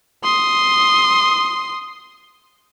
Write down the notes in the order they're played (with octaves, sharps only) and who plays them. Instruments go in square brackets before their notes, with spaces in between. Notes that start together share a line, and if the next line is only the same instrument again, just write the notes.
[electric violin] C6 D#6